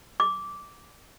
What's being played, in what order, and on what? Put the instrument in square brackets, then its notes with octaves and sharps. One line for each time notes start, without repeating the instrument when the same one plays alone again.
[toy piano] D6